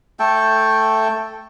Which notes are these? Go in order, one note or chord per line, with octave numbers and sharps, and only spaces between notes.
A3 A4 G5